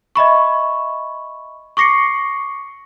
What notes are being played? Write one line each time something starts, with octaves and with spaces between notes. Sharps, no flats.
D#5 E5 B5 C#6
C#6 D6 A#6 C7 C#7